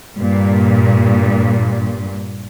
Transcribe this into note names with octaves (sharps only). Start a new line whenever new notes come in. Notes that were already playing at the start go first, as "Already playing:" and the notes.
G2 A#2